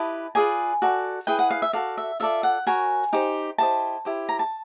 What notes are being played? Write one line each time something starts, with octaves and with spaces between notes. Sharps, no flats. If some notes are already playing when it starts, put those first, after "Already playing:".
Already playing: E4 G4 B4 D#5 A5
F4 G#4 B4 D5 G#5
F#4 A4 D5
E4 G#4 B4 G5
F#5
F5
E5
F#4 A4 D5 F5
E5
F4 A4 D5 E5
F#5
F#4 A#4 C#5 G#5
D#4 G4 C5
E4 G4 C5 D#5 A5
E4 G4 C5
A#5
A5